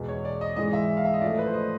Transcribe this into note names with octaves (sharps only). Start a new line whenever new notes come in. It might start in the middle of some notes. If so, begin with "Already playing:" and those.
Already playing: E2 B2 G#3
C#5
D5
D#5
G#2 E3 G#3 D#5
E5
F5
E5
D#5
A2 F3 A3 D5
B4
C5
D#5